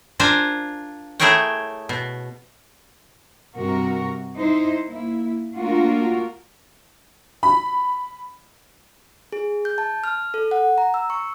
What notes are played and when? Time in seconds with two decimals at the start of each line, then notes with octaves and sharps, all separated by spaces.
0.20 D4 F4 A#4 C5 G#5
1.20 A3 E4 G#4 A#4 C#5 G5
1.89 B2
3.56 G2 C3 F#4 A#4
4.35 D#4 E4 C5
4.87 A#3 E4
5.55 A3 A#3 D4 F4 F#4 A#4
7.43 B5
9.32 G#4
9.65 G6
9.78 A5
10.04 F6
10.34 A4
10.51 F#5
10.78 A#5
10.94 E6
11.10 C#6